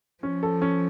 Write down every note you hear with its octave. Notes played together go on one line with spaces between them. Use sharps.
F3 C#4
A4
C#4